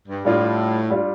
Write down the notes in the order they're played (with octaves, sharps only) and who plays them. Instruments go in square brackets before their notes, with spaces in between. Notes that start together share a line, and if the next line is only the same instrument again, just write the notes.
[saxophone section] G2
[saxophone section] A2 [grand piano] G3 D4 F4
[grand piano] G3 D4 F4